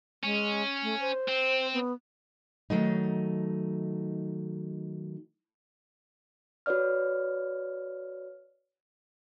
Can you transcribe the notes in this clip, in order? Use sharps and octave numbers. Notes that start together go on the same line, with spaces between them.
G#3 C#4
A3
C5
C4
B3
D#3 E3 F#3 A3 D#4
F#4 B4 C#5 D5 F6